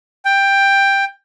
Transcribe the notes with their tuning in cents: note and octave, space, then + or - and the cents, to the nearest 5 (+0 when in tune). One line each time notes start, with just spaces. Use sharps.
G5 +10